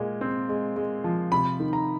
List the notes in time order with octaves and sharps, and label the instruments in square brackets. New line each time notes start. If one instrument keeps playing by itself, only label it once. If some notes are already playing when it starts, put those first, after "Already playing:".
Already playing: [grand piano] A#2 G#3
C4
G#3
G#3
F3
C3 B5
D#3
A#5